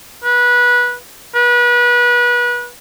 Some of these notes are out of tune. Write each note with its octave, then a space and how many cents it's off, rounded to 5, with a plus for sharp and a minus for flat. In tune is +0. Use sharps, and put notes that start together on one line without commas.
B4 -20
B4 -30